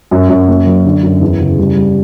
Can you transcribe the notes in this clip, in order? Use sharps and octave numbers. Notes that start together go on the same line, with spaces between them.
F#2
F#2
A#3
F#3
D3
F#2
E2
C#3
G3
G3